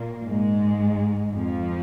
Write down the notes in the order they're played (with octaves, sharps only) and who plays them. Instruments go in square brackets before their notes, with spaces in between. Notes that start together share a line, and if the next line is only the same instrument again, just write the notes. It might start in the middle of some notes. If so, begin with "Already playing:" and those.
Already playing: [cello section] A#2 A#3
G#2 G#3
F2 F3